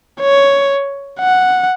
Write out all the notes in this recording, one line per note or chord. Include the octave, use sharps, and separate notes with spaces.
C#5
F#5